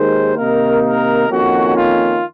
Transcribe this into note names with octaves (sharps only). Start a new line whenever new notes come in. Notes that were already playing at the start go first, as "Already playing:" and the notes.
Already playing: D#2 D#3 G#3 C5
C3 D#3 A#3 D#4 A#4
A#4
F2 D#3 A#3 C#4 F#4
F4